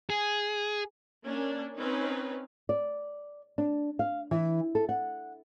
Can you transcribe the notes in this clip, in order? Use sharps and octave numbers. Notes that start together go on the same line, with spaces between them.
G#4
A#3 C#4 D4
C4 C#4 D#4 B4
D5
D4
F5
E3
A4
F#5